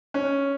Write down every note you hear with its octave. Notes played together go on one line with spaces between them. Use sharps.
C#4